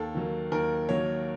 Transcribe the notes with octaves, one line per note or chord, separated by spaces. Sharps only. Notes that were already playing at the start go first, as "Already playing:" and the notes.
Already playing: D#2 A4
D#3 F#3 A#3
D#2 A#4
D#3 F#3 A#3 C#5